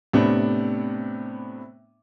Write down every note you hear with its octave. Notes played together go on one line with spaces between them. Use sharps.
A2 C3 B3 D4